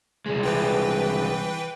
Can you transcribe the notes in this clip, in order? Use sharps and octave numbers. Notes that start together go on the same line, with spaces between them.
C2 G#3
E3 B4 G5